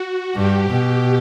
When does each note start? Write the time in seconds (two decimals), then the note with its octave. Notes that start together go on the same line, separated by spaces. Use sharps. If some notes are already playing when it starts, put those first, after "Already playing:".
Already playing: F#4
0.35 G2 G4
0.70 B2